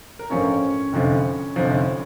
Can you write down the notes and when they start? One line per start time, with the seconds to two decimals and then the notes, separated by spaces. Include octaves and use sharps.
0.19 A#4
0.30 A1 G2 F3 A3 C#4 C#5
0.93 F1 F2 D3 F3
1.56 F1 F2 D3 F3